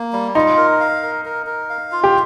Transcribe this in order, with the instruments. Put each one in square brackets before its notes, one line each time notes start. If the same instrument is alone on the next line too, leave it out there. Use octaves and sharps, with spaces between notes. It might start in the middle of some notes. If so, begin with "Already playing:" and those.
Already playing: [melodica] A#3
G3
[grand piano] D#4 [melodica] F4
[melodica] A#4
F5
A#4
A#4
A#4
F5
F4
[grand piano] G4